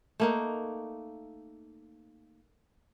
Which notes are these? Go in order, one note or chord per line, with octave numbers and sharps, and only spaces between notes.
A3 A#3 D#4